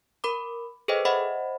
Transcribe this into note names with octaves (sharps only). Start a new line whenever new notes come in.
A#4 B5 D6
G#4 A4 B4 C5 D#5 G5
C5 D#5 E5 F#5 B5